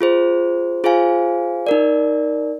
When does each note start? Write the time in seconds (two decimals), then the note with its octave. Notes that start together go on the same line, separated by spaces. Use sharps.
0.01 F4 G#4 C5
0.84 F4 G#4 C5 F5 G#5
1.67 D#4 A#4 D5